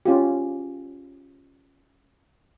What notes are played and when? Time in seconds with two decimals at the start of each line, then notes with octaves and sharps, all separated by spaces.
0.06 C#4 F4 G4